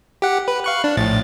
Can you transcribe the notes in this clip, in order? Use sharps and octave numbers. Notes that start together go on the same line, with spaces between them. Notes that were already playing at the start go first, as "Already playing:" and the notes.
G4 F#5
B4
F5 C#6 F#6
D4
A#1 A2 A6